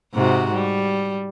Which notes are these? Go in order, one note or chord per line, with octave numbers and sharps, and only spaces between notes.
G#2 C3 F#4
G3